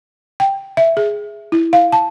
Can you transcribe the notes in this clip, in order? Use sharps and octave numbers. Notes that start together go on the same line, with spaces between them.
G5
E5
G#4
E4
F5
A5